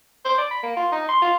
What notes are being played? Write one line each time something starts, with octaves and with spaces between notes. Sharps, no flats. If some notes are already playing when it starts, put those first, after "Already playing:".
C5
D5
B5
A#3
F4
D#4
C6
F4